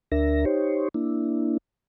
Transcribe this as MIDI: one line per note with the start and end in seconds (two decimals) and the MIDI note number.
0.12 0.45 38
0.12 0.45 62
0.12 0.45 70
0.12 0.45 76
0.12 0.45 94
0.45 0.88 63
0.45 0.88 67
0.45 0.88 72
0.45 0.88 73
0.94 1.58 58
0.94 1.58 62
0.94 1.58 64